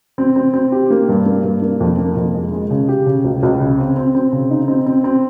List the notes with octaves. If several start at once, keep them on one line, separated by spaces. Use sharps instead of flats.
C4
C4
C4
G4
A#3
G2
A#3
G2
A#3
F2
A#3
F2
G#3
G#3
C#3
G4
C#3
C#2
C#2
C#3
C4
C4
C4
C#3
D#4
C4
C4
C4